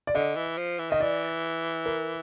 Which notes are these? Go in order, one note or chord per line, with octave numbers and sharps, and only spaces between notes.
D5
D3 D#5
E3
F3
E3
D#3 D#5
E3 D5
A#4